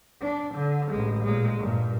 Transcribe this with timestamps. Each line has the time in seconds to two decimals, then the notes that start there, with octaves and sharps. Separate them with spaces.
0.21 D4
0.54 D3
0.91 A1 G#3
1.23 A#2 G#3
1.60 G2 A#2